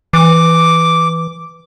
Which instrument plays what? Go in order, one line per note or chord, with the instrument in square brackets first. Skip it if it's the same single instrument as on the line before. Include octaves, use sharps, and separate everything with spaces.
[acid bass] E3 [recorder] D6